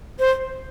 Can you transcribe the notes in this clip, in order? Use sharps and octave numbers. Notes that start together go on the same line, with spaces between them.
C5